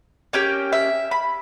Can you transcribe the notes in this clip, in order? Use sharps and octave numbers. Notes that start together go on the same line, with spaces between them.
A#3 C#4 G4 G5
E5
B5